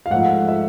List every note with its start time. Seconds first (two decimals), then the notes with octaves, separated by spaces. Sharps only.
0.06 F5
0.10 G#2 F3 A3 F#5
0.49 E5